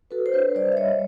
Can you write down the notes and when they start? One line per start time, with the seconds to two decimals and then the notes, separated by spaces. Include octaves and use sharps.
0.11 F#4 A4 B4
0.26 C5
0.33 D4 B4 C#5
0.55 G3 C5 D5
0.72 E5
0.77 G3 C#5 D#5